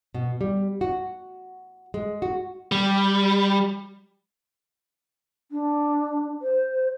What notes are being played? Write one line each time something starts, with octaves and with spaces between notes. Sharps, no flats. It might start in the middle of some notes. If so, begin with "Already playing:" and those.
B2
G3
F#4
G#3
F#4
G3
D4
C5